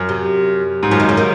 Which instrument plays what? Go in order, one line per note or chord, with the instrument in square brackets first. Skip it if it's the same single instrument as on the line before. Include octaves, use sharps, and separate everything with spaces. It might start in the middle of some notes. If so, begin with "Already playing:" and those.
Already playing: [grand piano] F#2
[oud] C3
[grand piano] G#2
[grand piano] F#2 [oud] F3
[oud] D#3
C#3
D#3